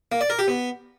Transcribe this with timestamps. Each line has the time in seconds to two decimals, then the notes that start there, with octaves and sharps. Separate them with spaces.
0.12 A#3
0.21 D5
0.30 A#4
0.39 G4
0.48 B3